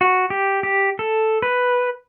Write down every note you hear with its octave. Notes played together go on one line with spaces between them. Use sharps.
F#4
G4
G4
A4
B4